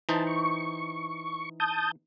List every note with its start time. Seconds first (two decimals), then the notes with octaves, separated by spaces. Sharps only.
0.09 E3 D#4 C5 A5
0.27 C#6
1.60 A5 D#6 G6